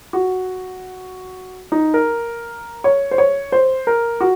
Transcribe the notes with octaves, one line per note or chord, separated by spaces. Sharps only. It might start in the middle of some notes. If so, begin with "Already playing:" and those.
F#4
D#4
A#4
C#5
C5
C#5
C5
A#4
F#4